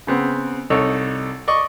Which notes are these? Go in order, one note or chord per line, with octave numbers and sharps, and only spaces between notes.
C#3 B3 C4
C2 D#4 A4 C#5
D5 D#5 C#6